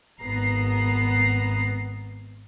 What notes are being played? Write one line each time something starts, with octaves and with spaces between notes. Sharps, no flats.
G#1 B3 A#5 C7